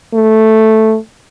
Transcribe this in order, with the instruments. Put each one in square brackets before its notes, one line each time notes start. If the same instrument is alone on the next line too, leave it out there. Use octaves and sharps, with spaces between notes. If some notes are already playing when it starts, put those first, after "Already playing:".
[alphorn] A3